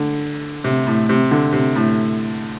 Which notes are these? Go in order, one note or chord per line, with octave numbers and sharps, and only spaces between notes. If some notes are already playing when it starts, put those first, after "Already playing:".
Already playing: D3
C3
A2
C3
D3
C3
A2